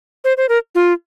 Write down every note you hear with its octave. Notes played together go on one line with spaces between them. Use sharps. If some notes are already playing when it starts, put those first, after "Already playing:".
C5
C5
A#4
F4